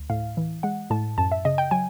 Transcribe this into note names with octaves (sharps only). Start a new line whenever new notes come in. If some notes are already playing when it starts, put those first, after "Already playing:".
Already playing: D2
A2 F5
E3
G#3 F#5
A2 A5
F#2 A5
E5
C#3 D#5
G5
F#3 G#5